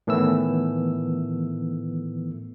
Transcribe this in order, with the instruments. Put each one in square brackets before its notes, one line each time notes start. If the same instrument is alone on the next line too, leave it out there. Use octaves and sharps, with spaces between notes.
[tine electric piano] A2 D#3 E3 A3 B3 E6